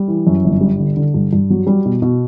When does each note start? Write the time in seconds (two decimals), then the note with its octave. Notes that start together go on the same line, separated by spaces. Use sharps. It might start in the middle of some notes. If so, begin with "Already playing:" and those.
Already playing: G3
0.08 E3
0.27 F#2
0.44 G1
0.61 G3
0.79 D3
0.97 D3
1.14 G2
1.33 G2
1.50 F#3
1.67 G3
1.85 B2
2.02 B2